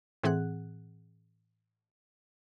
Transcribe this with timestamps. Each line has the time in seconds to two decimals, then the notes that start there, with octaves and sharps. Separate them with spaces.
0.23 A2 E3 C4 G#4 F#5 F#6